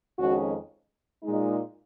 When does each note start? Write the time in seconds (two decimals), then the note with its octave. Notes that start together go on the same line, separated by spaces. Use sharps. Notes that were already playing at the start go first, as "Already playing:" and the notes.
0.17 F2 D#3 G#3 C#4 F#4
1.22 A#2 G#3 D#4